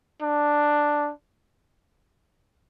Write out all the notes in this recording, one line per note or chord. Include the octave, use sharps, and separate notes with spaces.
D4